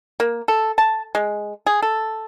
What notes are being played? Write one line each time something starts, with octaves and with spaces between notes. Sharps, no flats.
A#3
A4
A5
G#3
G#4
A4